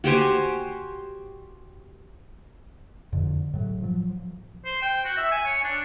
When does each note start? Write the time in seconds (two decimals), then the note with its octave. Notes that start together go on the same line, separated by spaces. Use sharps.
0.04 F#4 G4 C5 G#5
3.12 F2 D3
3.53 A2 F#3
3.82 F3 F#3
4.65 C5
4.82 G5
5.05 F#4
5.18 E5
5.32 G#5
5.45 C#5
5.64 D4